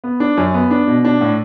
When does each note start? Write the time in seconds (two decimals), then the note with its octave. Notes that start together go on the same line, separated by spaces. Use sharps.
0.04 B3
0.20 D4
0.37 F#2
0.54 B3
0.71 D4
0.87 B2
1.05 D4
1.21 A2